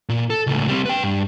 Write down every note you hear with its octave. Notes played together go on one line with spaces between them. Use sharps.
A#2
A4
C#2 A2
G3 C4
B4 G5
G2